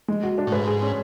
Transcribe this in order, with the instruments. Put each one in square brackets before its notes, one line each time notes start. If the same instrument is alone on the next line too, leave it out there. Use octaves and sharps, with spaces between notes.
[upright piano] G#3
F#4
D4
[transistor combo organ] A2
[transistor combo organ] G#2 [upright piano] B4
[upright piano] G#4
C#4